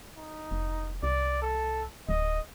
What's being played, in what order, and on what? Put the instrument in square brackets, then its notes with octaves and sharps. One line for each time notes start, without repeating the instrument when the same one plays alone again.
[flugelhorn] D#4
[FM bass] F1
[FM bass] C2 [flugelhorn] D5
[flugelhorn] A4
[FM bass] D1 [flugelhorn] D#5